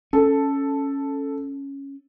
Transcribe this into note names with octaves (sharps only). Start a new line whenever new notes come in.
C#4 A4